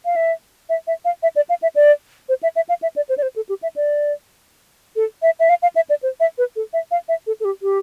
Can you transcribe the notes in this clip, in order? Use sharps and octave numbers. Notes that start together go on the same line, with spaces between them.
F5
E5
E5
E5
F5
E5
D5
F5
E5
D5
C5
E5
E5
F5
E5
D5
C5
D5
C5
A4
G4
E5
D5
A4
E5
E5
F5
F5
E5
D5
C5
E5
B4
A4
E5
F5
E5
A4
A4
G4
G4